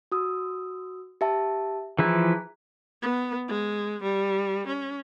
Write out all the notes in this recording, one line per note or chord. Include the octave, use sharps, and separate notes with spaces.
F#4 D#6 E6
G4 E5 A5
E3 F3 E4 G#4 A#5 F#6
B3
G#3
G3
C#4